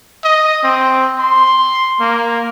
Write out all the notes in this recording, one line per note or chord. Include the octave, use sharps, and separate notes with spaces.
D#5
C4
C6
A#3